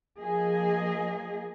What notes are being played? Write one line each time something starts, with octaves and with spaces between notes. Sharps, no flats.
F3 A#3 G#4 D#5